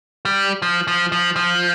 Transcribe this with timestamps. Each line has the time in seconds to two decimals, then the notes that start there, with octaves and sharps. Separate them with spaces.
0.25 G3
0.62 F3
0.88 F3
1.12 F3
1.36 F3